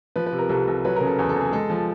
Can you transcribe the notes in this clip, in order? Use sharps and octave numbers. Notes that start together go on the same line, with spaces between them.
F3 B4
B4
C3
A#4
C2 A4
C2
F#3 B4
C#3 A#4
A4
E2 G#4
A4
E2
G#4
G#3 A4
F3